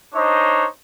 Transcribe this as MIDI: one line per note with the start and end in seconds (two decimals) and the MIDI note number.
0.15 0.67 62
0.15 0.67 63
0.15 0.67 72
0.15 0.67 73
0.15 0.67 75